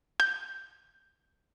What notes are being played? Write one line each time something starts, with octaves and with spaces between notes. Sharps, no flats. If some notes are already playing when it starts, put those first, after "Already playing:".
G6